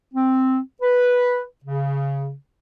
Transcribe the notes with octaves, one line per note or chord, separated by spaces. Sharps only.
C4
B4
C#3